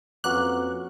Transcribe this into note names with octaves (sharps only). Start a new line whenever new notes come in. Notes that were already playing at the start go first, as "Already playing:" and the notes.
F2 A#3 C#4 F#4 B4 F#5 D6 F#6